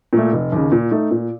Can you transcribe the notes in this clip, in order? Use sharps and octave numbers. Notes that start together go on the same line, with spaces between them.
A#2 A3
F1
D#2 C#3
A#2
A3 D#4 A4
A#2